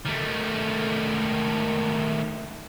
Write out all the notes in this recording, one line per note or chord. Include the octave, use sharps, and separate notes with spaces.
D#3 A3